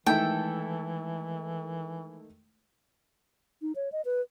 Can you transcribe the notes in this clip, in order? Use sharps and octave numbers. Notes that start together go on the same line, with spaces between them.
D#3 E3 G#3 A3 E4 A4 G5
D#4
C#5
D#5
B4